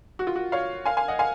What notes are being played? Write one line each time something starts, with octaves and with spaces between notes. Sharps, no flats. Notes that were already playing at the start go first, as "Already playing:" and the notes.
F#4
F4
F#4
C#5 F5
F5 G#5
F5 G#5
D#5 F#5
F5 G#5